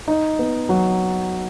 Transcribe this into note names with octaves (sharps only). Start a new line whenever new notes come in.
D#4
B3
F#3